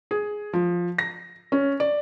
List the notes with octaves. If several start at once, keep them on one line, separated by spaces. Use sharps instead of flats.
G#4
F3
A#6
C#4
D5